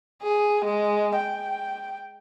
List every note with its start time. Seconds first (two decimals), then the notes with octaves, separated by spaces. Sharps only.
0.23 G#4
0.65 G#3
1.16 G5